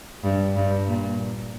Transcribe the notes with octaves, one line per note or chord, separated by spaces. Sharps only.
G2
G2
A#2